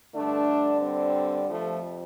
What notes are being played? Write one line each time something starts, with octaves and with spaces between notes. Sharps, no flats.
G2 D3 A3 D4
G3 C4
F2 C3 F3 A3